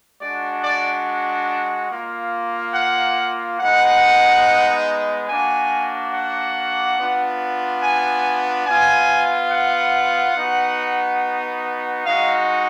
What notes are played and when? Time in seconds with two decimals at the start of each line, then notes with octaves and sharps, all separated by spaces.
0.21 G#3 D4 F#4 D5
0.63 D5
1.90 A#3 F4
2.75 F#5
3.59 G#3 B3 D#4 F#5
5.28 A#3 D4 F#4 G#5
6.13 F#5
6.97 B3 D4 F4
7.83 G#5
8.67 B3 F4 G#5
9.51 F#5
10.36 B3 D#4 F#4
12.05 G#3 D#4 F#4 F5